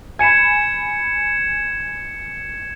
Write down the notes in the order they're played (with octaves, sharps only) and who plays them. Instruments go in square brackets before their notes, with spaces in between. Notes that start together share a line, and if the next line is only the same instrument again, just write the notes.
[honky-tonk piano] G#5 B5 [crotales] G#6 C#7 E7